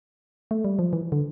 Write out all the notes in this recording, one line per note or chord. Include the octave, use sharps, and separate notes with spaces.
A3
G3
F3
E3
D3